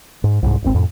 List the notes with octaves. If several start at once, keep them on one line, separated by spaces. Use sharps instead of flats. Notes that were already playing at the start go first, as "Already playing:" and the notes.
G#2
C2 G#2
D#1 G#1 C4
F2 A2